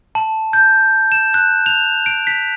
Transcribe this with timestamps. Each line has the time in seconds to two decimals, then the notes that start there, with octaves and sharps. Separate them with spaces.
0.15 A5
0.53 G6
1.12 E7
1.34 F#6
1.66 F7
2.06 D7
2.27 B6